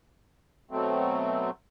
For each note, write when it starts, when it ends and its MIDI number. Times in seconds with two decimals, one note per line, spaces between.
0.71 1.50 47
0.71 1.50 54
0.71 1.50 57
0.71 1.50 60